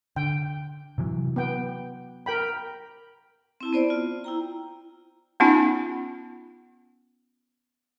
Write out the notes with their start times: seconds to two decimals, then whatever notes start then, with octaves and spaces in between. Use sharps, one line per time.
0.16 D3 G5
0.98 C3 E3 F#3
1.36 B3 G5
2.26 A#4 G5 B5
3.60 C4 E4 A5
3.73 B3 C5 D5
3.90 F4
4.24 E4 G5 A#5
5.40 B3 C#4 D#4 F4 G#5